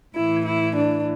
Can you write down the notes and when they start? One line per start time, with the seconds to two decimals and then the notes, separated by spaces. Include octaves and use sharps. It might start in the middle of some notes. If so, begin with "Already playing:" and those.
0.15 A2 E3 E4
0.45 E4
0.75 D4